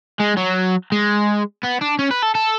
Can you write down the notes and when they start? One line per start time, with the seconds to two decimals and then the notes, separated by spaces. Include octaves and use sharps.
0.20 G#3
0.37 F#3
0.92 G#3
1.63 B3
1.81 D4
1.99 C#4
2.11 B4
2.23 A4
2.35 A4